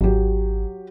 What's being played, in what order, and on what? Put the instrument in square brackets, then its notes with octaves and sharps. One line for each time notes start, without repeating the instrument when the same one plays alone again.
[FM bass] G#1 [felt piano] F#3 G4